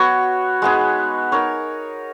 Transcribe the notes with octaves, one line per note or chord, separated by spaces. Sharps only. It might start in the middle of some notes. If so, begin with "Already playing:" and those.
Already playing: B3 F#4 C#5
G#3 B3 D#4 G#4
D#4 A#4 C#5